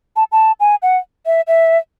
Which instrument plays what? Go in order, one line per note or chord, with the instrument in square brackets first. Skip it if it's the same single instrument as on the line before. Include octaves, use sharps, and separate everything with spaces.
[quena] A5
A5
G#5
F#5
E5
E5